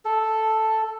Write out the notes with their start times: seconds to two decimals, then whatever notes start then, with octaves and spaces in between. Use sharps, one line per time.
0.05 A4